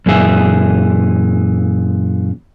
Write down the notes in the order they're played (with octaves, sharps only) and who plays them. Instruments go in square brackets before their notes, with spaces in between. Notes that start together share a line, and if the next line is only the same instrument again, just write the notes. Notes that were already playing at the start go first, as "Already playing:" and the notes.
[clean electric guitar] F#2 A#2 E3 G#4 E5